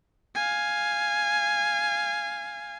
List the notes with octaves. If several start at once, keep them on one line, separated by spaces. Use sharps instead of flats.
F5 G#5